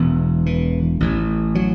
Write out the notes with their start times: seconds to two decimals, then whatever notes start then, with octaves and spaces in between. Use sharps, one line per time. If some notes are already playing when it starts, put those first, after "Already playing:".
Already playing: E1 E2 B2
0.46 E3
1.00 A1 A2
1.55 F#3